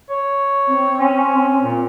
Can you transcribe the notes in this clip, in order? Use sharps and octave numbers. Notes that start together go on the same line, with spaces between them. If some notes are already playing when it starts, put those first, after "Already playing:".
C#5
C4
C#4
A#2